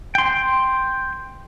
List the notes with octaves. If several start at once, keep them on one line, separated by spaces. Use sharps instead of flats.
G5 C6